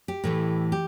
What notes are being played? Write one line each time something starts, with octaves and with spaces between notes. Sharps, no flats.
G4
A2 E3 A3
G4